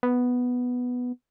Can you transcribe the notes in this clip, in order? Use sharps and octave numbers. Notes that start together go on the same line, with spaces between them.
B3